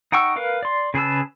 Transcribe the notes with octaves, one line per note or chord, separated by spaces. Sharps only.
D#4 F#5 G5 C#6 E6
A#4 B4 F5
D5 C6
C#3 G#4 B4 A5 E6